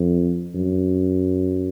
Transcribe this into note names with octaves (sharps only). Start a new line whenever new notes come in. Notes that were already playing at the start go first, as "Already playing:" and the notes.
Already playing: F2
F#2